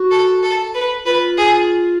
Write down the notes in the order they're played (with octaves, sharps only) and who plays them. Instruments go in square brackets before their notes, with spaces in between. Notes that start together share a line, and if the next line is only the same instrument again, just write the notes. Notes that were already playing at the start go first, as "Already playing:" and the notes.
Already playing: [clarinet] F#4
[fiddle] A4
A4
B4
[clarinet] F4 [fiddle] B4
[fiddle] G#4